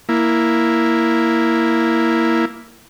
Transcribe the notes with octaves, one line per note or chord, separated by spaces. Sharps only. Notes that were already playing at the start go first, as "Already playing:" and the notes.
A#3 E4